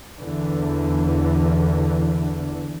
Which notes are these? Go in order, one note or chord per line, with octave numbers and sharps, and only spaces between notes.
E2 D3 E3